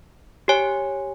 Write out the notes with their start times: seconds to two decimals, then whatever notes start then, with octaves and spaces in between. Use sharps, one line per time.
0.48 G4 C#5 G#5